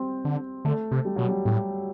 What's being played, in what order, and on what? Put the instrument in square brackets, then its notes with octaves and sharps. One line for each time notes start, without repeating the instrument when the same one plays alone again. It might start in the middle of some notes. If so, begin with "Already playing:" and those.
Already playing: [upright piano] G3 C4
[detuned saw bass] D3
[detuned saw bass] D3 [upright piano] A3
[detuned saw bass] C3
[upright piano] G3
[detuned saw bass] B2 [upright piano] F#3
[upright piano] G3
[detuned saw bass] A2 [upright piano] G3